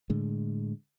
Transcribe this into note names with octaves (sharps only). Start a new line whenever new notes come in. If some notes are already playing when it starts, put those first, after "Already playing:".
A2 D3 G#3